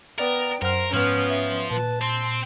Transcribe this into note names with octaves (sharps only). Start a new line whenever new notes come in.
B3 A#4 D5 G5 A6
F#2 A#4 C5 F#5 F6
G#2 F3 B3 C#4 F6
E5
A#2 B4 A5
C4 C6